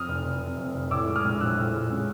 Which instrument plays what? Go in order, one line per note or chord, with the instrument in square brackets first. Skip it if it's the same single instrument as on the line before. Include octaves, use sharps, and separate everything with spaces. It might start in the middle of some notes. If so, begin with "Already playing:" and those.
Already playing: [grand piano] F2 D#6 F6
F1
F1
C3
F2
F1
A2 D6 E6
G#3
D#6 F6
A#1
F3 E6 F#6
A2
G#3
C#3